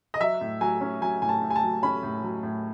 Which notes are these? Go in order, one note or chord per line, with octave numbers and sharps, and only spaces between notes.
D#5
F#3 E5
A2
F#3 G#5
C#4
F#3 G#5
A2 G#5
A5
A2
G#5
A5
F#3
C#4 B5
A2
F#3
A2